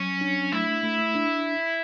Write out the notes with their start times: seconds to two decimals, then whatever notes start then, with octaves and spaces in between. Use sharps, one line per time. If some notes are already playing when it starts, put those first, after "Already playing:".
Already playing: F#3 C#4
0.21 D4
0.52 A3 E4
0.83 A3
1.15 D4